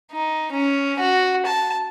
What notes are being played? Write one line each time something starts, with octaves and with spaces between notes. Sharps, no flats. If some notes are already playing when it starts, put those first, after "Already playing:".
D#4
C#4
F#4
A5